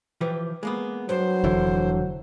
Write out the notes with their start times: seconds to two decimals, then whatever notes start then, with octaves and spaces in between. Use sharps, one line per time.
0.21 E3 F3 G4
0.63 G#3 A#3 B3
1.09 G2 F#3 C5
1.44 F1 D3 E3